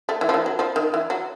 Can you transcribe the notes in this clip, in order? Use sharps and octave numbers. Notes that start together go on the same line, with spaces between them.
A3
E3
F3
E3
F#3
F3
D#3
E3
F#3